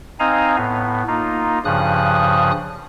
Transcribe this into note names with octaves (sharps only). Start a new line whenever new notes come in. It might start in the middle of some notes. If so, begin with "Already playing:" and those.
C4 D#4 D#5 F5 G#5 A#5
A2 B3
A#3 D#4 F4
G2 C#3 F3 D#6 F#6